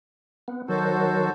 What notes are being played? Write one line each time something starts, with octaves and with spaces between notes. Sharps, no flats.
B3
D#3 F#3 F#4 A4 C5